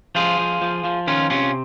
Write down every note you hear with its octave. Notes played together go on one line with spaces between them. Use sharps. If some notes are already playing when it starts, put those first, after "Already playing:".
F3 F4 G#4
F3
F3
F3
D#3 C#4 F4
C3 C#4 F4